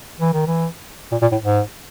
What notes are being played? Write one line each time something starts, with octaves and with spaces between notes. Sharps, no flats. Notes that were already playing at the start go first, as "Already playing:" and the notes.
E3
D#3
E3
A#2
A#2
A2
G#2